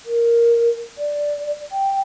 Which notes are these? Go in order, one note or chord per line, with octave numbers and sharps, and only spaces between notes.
A#4
D5
G5